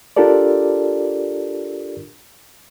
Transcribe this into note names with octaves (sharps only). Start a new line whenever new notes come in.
D4 F4 G4 A4 A#4 D5